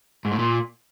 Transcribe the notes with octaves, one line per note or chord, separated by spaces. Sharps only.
G#2
A2
A#2